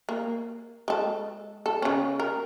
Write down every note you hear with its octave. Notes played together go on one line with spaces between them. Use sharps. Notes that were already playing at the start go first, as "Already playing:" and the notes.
A#3
G#3 A4
A4
C#3 C#4
A#4